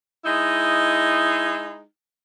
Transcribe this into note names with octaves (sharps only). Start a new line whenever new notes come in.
G#3 D#4 E4